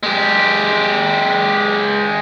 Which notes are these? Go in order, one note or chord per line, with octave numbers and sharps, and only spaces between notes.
G#3 G4